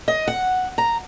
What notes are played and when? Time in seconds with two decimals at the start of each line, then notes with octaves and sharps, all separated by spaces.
0.08 D#5
0.27 F#5
0.78 A#5